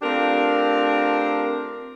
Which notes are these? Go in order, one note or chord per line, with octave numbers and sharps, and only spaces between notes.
A3 C4 D4 F4 G4 A#4